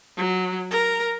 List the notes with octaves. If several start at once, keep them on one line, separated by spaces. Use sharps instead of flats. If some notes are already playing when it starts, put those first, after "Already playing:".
F#3
A#4